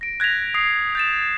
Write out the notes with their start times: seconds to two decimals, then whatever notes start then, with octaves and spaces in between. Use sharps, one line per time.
0.01 A#6 D7
0.20 F#6 G#6 A#6 B6 F7
0.54 D#6 C7
0.95 G6 A6 E7